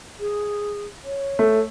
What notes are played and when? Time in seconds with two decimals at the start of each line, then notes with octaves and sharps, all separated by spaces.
0.19 G#4
1.04 C#5
1.39 A3